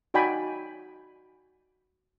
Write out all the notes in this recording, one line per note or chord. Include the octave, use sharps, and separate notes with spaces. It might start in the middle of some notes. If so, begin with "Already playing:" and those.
D#4 F#4 D5 G5 G#5 B5